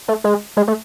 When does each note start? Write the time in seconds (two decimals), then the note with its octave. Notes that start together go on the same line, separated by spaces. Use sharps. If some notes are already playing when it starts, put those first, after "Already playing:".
0.08 A3
0.24 G#3
0.57 G#3
0.68 A3